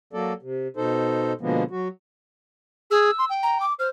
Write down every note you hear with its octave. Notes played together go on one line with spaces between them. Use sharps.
F#3 A#3 A4 D5
C3
B2 D#4 A4 C5
B2 D3 F3 G#3 A#3 B3
F#3 F#4
G#4 E6
C6
G5
A#5
D6
C5 F6